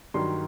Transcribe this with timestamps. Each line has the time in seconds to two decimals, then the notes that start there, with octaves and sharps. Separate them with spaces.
0.14 G2 D#3 F#3 C6